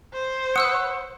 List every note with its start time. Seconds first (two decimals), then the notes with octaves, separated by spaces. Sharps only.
0.13 C5
0.56 F#5 D#6 E6 F#6